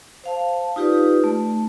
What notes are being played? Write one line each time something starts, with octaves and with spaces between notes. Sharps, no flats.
C5 F5 A5
D#4 F4 G4 B4 D5
A3